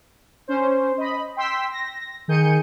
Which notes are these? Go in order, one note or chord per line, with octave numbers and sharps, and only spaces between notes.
C#4 C5
D#5 B5
G5 C6 E6 B6
A#6
D#3 G#4 G6 C#7 D#7